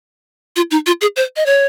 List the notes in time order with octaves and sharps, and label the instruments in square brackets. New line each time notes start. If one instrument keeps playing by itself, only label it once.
[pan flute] F4
D#4
F4
G#4
C5
D#5
C#5